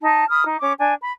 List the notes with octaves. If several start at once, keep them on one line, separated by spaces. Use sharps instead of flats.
D#4 A5
B5 D#6 F6
D#4
C#4 D6
D4 G#5
B5